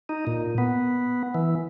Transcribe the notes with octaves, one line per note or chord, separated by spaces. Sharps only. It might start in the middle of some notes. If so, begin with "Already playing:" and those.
D#4
A#2
B3
E3